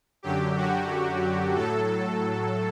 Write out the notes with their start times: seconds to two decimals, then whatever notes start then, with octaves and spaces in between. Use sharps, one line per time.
0.23 F#2 D3 F#3 G4
0.57 F#4
1.55 A2 F#3 A4